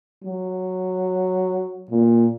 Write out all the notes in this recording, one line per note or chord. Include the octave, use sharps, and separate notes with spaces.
F#3
A#2